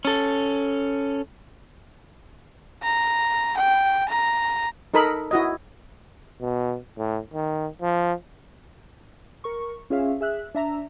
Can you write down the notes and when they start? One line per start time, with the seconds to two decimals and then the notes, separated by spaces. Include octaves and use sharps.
0.05 C#4 A4
2.83 A#5
3.57 G5
4.09 A#5
4.94 D#4 A4 A#4 D#5 B5
5.31 E4 F#4 D#5
6.41 B2
6.97 A2
7.34 D#3
7.82 F3
9.44 A#4 C#6
9.90 C#4 F4 G#4 C#5 E5 F5
10.21 G#4 E5 F#6
10.55 D4 E5 A#5